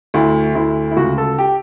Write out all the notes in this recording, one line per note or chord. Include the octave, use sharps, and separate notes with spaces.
D2 E4
D2 E4
E4
C#2 F#4
A4
G4